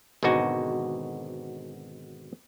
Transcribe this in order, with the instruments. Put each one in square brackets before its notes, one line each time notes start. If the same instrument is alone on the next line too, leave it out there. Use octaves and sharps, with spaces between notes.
[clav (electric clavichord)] G#1 B2 D3 D#4 F#4 G#5